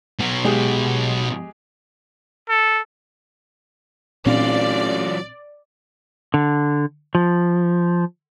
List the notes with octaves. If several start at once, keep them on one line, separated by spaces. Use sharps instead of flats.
B2 F#3
G#3 G4 G#4
A4
A1 A#2 E3 F#3 C4 D4 F4 D5
D3
F3